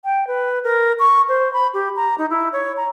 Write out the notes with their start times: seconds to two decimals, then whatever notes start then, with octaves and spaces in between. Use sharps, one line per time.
0.05 G5
0.27 B4
0.64 A#4
0.99 C#6
1.29 C5
1.53 B5
1.74 G4
1.96 A#5
2.18 D#4
2.30 E4
2.53 C#5
2.77 A#5